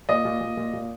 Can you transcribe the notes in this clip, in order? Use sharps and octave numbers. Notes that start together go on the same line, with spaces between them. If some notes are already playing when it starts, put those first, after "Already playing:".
A#2 D#5
A#2
A#2
A#2
A#2